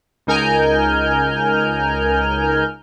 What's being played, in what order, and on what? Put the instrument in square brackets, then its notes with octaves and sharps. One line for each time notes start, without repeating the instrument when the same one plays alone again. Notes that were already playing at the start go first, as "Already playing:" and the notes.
[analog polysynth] C#2 D#4 A#4 G#5 F6 G6